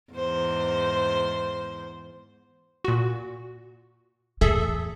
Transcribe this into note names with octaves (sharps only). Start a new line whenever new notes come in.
E2 G#2 C5
A#2 F#4
E2 A2 G#4 A4 E5